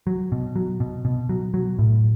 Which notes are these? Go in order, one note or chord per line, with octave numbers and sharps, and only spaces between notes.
F#3
B2
F#3
B2
B2
F#3
F#3
A2